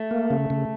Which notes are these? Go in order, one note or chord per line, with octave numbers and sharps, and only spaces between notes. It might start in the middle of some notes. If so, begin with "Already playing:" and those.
Already playing: A3
A#3
C#3
C#3